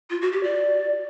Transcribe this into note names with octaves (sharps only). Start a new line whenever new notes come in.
F4
F#4
G4
D5